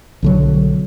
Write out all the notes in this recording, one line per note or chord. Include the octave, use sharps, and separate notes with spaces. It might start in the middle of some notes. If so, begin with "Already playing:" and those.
B1 D3 F#3